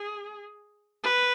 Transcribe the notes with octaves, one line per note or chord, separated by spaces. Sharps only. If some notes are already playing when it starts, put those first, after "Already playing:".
Already playing: G#4
B4